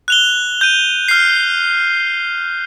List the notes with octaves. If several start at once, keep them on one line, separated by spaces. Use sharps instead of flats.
F#6 F7 G7
G6 D#7
F6 C7